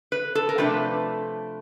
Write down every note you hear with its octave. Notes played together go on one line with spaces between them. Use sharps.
B4
A4
A#4
C3 F3 A3 D4 B4